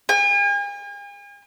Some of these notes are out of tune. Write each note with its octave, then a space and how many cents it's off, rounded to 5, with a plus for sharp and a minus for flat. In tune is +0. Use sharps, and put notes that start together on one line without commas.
G#5 -45